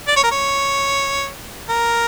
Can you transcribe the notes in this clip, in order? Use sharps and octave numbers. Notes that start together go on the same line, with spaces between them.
D5
C#5
A#4
C#5
A#4